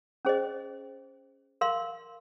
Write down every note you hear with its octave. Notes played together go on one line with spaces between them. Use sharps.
C#4 G#4 C5 D#5
A#4 F5 C6